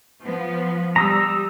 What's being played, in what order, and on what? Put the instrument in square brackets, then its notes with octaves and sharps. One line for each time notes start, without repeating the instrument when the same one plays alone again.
[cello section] F3 B3
[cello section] G3 [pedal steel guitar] A#5 D#6 E6